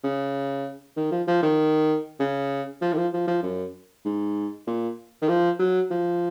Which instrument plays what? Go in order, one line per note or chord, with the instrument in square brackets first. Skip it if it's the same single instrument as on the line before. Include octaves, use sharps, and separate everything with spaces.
[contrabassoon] C#3
D#3
F3
F3
D#3
C#3
F3
D#3
F3
F3
F3
F#2
G#2
A#2
D#3
F3
F#3
F3